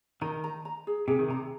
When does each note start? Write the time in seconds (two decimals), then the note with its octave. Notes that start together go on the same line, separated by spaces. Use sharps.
0.21 D#3 A#5
0.44 A#5
0.65 A#5
0.87 G#4
1.08 C3 G#4
1.19 D#3
1.28 C3 A#5